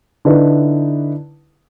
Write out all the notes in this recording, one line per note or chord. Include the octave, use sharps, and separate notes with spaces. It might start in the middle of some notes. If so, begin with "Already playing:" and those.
D3 D#4 E4 B4